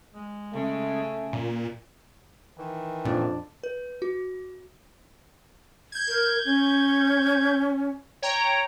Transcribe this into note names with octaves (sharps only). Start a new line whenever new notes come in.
G#3
C#3 A3
C#4
A#2
D#3 E3
F2 A#2 D4
B4
F#4
G6 G#6
A#4
C#4
C#5 G5 A#5